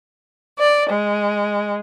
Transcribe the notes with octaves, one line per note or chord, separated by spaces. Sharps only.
D5
G#3